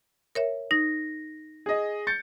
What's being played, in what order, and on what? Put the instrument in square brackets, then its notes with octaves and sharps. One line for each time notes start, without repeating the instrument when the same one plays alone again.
[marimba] A#4 C#5 E5
[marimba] D#4 [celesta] A#6
[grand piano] G#4 D#5
G6 A6 C#7